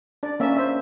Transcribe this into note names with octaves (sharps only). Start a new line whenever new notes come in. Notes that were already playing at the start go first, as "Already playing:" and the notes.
D4 D5
A#3 C#4 E5
C5 E5